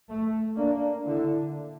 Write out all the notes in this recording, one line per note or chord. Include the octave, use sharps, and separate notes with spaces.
A3
A#3 D4
D3 E4